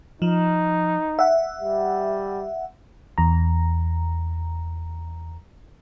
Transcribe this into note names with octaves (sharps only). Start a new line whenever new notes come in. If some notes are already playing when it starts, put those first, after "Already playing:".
F3 D#4
E5 F#5
G3
E2 A#5